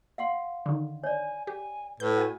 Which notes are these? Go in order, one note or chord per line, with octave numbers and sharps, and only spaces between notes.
F5 F#5 C6
D3 D#3
C#5 D5 G#5
G4 G#5
A2 B4 G6
F#4 G#5